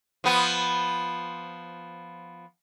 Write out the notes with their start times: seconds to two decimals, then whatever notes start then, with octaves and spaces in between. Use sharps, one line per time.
0.24 F3 B3